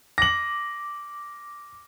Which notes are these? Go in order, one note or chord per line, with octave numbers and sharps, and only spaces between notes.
D6 A#6 F#7